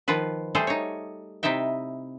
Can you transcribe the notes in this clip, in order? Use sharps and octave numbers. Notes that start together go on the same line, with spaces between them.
D#3 F3 F4 B4
G3 A3 G#4 A4 C5
D#4 C#5
C3 D#4 E4 E5 G5